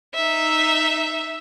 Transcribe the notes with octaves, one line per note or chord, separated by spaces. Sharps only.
D#4 E5